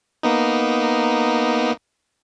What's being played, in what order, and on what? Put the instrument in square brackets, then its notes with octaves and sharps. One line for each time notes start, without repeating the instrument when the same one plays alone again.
[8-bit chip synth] A#3 B3 D#4